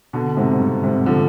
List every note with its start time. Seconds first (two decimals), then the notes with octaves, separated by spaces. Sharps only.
0.13 B2 D3
0.37 G#2 C3
0.60 G2
0.84 G#2 C3
1.06 D3 F3